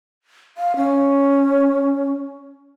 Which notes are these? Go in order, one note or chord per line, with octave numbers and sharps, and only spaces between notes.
F5
C#4